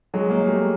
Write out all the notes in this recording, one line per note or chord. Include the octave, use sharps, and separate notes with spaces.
F#3 G#3
G#3 A#3
G#3
G3 A3